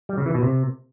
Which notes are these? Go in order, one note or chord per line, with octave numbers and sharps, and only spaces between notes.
G3
C#3
E3
B2
C3